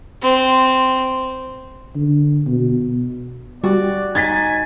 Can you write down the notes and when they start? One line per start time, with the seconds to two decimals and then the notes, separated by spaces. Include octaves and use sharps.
0.22 C4
1.96 D3
2.47 B2
3.64 G3 F#4 D5
4.15 D#4 G#5 G#6 A6 B6